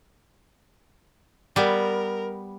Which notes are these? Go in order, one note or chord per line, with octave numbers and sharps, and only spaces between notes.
G3 B3 A#4